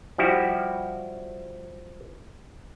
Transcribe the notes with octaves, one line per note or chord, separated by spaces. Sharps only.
F3 G3 E4 F#4 G4